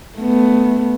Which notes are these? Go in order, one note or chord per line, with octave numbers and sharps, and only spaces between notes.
A3 B3